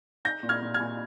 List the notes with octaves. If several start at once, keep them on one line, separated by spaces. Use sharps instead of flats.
D#4 G6 A#6
A#2
F6 G#6
A#2
F6 G#6
A#2